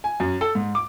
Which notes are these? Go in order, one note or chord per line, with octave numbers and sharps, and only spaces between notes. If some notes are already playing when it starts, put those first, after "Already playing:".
G#5
F#2
A4
G#2
D6